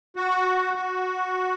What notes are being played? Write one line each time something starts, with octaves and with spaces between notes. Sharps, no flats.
F#4
F#4